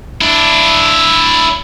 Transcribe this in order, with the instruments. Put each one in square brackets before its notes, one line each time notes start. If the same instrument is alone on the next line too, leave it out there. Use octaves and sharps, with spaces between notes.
[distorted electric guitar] D4 E4